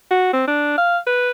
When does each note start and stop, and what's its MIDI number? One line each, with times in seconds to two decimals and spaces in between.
0.11 0.30 66
0.33 0.43 60
0.47 0.73 62
0.78 0.98 77
1.07 1.31 71